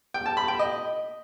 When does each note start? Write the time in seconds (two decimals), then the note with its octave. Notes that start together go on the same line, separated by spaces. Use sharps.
0.14 G5
0.26 A5
0.37 B5
0.48 G5
0.59 D#5